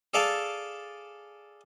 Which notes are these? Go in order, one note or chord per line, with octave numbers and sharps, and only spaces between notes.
G#4 A4 D5 F5 G#5 A5